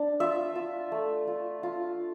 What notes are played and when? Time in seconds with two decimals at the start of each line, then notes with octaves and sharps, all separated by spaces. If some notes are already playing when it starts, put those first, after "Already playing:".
Already playing: D4
0.20 F4 E5
0.55 F4
0.92 A3
1.27 F4
1.63 F4